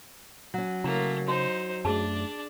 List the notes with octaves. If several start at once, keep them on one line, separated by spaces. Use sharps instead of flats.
F#3 C#4
C#3 A3 A#3 E4
D#4 F#4 C5
F#2 A3 D4 G#4 D5 A5